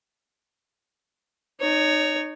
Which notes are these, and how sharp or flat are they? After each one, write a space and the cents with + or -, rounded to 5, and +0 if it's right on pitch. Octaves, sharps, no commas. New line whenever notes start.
D#4 -25 C#5 +10